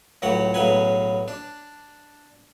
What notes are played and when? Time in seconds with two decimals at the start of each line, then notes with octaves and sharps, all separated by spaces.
0.22 C#2 A2 F#3 F#4 F#5
0.54 B1 A2 C#3 F#3 B4 G#5
1.28 D4